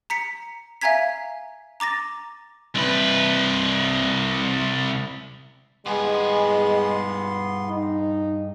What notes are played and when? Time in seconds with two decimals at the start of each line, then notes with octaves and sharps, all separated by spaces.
0.10 A#5 B6 C#7
0.81 E5 F5 G#5 A#5 G#6 B6
1.80 A#5 D6 A6 A#6
2.75 C2 B4
5.86 G2 G#3 B3 G#4 C6
7.69 D#4